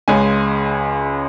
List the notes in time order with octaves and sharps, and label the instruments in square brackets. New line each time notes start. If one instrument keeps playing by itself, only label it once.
[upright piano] C#2 C#3 G#3 C#4 G#5